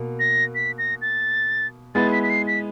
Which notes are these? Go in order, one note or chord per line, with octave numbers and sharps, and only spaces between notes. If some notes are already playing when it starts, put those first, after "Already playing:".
Already playing: B2 A#3
A#6
B6
A#6
A6
G#3 B3 E4 A6
B6
B6
C7
B6